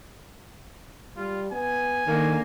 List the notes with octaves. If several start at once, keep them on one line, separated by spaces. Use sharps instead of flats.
G3 F4
B3 G#5
D3 D#3 A#3